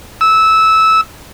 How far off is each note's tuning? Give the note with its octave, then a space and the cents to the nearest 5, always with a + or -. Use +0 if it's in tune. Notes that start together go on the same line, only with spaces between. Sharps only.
E6 -15